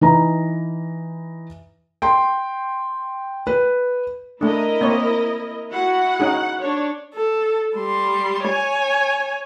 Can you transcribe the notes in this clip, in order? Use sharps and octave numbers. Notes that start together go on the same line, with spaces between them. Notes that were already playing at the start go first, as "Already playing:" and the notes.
E3 D#4 B4 A#5
G5 C6
B4
A3 D4 E4 A#4 D#5
A#3 C4 C#5
E4 F#4 F#5
C#4 D#4 G#4
D4 C#5
A4
G3 C6
C#5 G#5